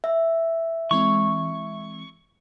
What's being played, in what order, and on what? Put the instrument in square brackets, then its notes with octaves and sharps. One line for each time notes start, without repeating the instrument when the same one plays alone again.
[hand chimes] E5
[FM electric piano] E3 G#3 C4 [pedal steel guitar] C#6